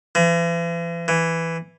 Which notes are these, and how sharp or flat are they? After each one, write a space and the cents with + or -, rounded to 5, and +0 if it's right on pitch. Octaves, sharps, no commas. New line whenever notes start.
E3 +45
E3 +5